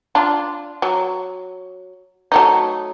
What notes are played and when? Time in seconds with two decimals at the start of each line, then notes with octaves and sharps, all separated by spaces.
0.15 D4 F4
0.82 F#3
2.32 F#3 A3 D#4